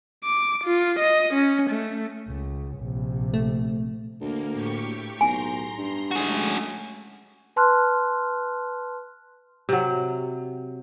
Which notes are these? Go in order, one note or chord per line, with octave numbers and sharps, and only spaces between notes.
D6
F4
D#5
C#4
A3
C#2
A#1 C3
A3
D2 A#3
A2 G4 C#6
B1 G#5 A#5 C6
G2
G#3 A3 C#4 F#4 G#4
B4 A5 C6 F6 F#6
C3 F#3